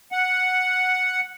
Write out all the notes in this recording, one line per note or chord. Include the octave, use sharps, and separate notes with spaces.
F#5